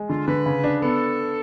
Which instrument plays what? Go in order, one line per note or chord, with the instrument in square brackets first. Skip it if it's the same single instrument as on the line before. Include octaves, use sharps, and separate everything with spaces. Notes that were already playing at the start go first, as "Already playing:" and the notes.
Already playing: [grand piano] G#3
[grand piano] D3 [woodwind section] F4
[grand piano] D3 [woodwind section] B4
[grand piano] C#3
D4
[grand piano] B3 [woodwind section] A4